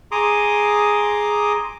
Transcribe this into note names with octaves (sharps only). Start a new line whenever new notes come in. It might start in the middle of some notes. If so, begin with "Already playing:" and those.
G#4 A#5 C6 D6 D#6